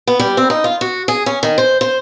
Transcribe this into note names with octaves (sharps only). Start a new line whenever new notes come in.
B3
G3
C4
D#4
F4
F#4
G#4
C#4
D#3
C5
C5